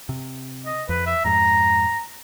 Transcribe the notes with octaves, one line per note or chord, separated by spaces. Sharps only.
C3
D#5
F2 B4
E5
F2 G#2 A#5